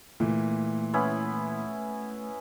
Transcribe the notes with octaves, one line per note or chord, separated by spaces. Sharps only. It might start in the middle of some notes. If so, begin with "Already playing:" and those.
A#2 E3 A3
B3 C#4 E4